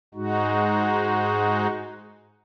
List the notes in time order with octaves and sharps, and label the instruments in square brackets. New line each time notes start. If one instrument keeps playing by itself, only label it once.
[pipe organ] G#2 G#3 D#4 F#4